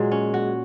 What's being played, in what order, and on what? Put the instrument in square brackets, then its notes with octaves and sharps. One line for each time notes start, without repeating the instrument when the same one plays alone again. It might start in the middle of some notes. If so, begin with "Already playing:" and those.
Already playing: [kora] A#2 F#3 [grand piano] G#3
[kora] C#4
F#4